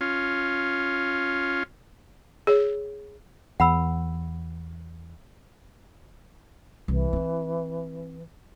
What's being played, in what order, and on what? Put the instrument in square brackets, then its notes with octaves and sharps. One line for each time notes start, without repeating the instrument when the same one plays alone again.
[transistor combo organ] C#4 F4
[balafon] G#4 C#5
[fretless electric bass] E2 [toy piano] F#5 B5 E6
[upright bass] C2 [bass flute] E3
[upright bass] C4 E4